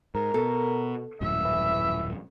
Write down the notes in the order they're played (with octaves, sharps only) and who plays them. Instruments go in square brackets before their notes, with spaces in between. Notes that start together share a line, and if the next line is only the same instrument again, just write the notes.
[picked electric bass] G#2 [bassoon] A#4
[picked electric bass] B2 [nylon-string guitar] A4
[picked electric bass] D#1 F#2 A2 [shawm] E5
[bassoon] E3